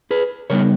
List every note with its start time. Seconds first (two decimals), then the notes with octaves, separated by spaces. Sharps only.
0.11 G#4 B4
0.50 C#3 G3 B3 D#4 A#4 C#5